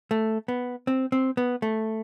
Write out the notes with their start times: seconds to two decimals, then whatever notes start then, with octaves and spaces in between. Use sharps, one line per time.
0.11 A3
0.48 B3
0.87 C4
1.12 C4
1.37 B3
1.62 A3